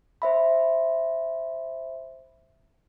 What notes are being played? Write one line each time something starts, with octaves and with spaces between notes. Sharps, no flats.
C5 E5 B5